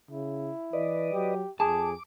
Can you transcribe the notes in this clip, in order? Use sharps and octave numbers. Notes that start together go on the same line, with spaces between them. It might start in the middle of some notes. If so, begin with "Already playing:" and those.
C#3 E4
E3 B4 D5 D#5
F#3 G4
F2 G#4 A5 D6